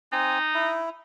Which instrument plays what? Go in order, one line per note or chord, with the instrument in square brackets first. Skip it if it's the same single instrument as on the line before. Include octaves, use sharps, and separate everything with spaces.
[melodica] C4 G#5 [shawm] D#4
[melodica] E4